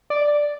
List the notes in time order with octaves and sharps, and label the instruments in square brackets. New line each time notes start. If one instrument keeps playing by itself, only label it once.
[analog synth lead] D5